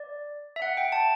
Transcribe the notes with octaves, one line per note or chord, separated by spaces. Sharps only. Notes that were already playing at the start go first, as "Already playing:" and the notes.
Already playing: D5
E5
F#5
G5
A5